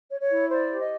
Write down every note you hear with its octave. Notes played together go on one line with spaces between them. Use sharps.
C#5
C#5
E4
C5 D5
G4
D#5